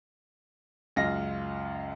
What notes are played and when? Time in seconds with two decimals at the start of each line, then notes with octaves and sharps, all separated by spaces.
0.96 C#2 F#2 F4 D#5 A#6